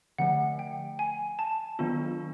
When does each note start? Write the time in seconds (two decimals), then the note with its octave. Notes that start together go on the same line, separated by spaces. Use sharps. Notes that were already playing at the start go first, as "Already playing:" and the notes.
0.18 D3 F3 A3 F#5
0.59 G5
0.99 G#5
1.39 A5
1.79 D#3 F#3 B3 D4 F4